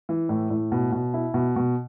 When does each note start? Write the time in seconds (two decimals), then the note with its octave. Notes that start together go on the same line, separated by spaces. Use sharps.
0.09 E3
0.29 A2
0.50 A2
0.72 B2
0.92 B2
1.14 E4
1.34 B2
1.56 B2